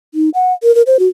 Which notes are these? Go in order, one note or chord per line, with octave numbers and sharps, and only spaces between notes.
D#4
F#5
A#4
A#4
C5
F#4